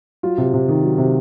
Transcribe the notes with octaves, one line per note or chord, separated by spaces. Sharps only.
F#3 F4
C3
C3
D#3
F#3
C3